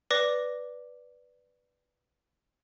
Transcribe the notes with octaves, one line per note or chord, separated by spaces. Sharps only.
B4 D5 D6 A#6